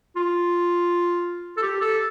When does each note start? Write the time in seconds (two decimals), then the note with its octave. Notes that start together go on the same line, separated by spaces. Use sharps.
0.17 F4
1.57 A4
1.63 G4
1.81 A4